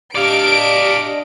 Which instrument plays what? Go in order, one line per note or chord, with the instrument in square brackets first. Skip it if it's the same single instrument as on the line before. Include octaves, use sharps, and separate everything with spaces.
[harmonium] D4 D#5 [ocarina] G4 [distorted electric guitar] D5 F5 [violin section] D7